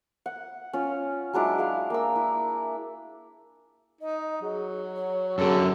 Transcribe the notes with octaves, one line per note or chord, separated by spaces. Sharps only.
F#5
C#4 F4
F#3 G#3 D4 E4
G#4 F5
A#3 E6
E4
D#4 D#5
F#3 G#4
C#5
F#2 D3 F#3 G#4 A4